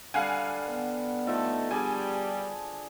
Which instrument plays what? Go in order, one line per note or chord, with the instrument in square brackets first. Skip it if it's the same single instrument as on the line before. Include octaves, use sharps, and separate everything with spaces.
[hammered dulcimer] D3 G3 [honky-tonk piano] F5 F#5 G#5
[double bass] B3
[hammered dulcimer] F3 A4 [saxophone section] A3 D#4
[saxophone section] G3 [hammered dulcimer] D4 G#4 A5 [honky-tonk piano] G#5